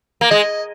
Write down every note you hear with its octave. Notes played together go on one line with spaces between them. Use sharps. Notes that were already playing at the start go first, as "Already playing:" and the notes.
A#3
G#3 D#5